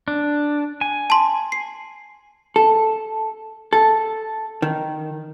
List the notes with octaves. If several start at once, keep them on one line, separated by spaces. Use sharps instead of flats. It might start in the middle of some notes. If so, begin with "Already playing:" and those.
D4
G#5
A5 C6
C7
A4
A4
D#3